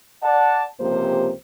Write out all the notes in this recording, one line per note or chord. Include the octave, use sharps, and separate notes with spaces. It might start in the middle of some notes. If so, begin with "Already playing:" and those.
D5 F#5 A5
C#2 C3 F3 A#3 G4 C5